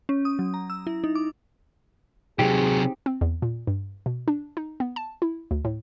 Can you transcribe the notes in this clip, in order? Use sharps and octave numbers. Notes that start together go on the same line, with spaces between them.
C#4
D#6
F#3
A#5
E6
E4
D#4
D6
C3 F#3 C4 D#4 G4 G#4
C4
E2
A#2
G2
B2
D4
D#4
B3
A5
E4
D2
A2